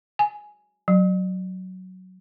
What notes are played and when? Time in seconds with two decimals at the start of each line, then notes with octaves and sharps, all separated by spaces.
0.19 G#5
0.88 F#3